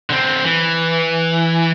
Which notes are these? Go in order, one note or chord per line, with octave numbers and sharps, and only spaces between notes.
D3 C4
E3